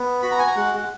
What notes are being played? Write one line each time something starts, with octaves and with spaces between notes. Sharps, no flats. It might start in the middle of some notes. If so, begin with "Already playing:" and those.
Already playing: B3
F#4 B5
A#5
G#5
A#5
G#3 F#5
F#5